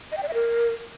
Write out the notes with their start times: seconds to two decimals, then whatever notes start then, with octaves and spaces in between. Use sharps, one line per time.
0.12 D#5
0.17 G5
0.23 D5
0.28 E5
0.34 A#4